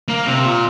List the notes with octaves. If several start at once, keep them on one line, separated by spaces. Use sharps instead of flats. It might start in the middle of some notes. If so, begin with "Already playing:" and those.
A#3
C3
A#2